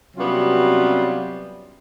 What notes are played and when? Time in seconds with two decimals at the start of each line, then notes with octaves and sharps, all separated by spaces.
0.17 C3 F#3 G3 B3 C#4 F4